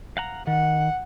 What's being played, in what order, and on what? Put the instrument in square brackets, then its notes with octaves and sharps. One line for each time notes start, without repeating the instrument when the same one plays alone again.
[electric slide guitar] F5 F#5 A#5
[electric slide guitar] D#3 [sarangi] F#5